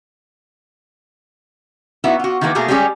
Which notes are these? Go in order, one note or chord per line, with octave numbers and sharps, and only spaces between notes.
B3 D#4 E4 F#4
F4 F#4
D#3 E3 G#3 A#3 B4
B2 A3 A#3 G#4 A#4
G3 G#3 C#4 G4 G#4